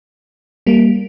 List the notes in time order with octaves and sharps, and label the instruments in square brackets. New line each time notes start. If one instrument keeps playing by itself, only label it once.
[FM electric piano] G3 A#3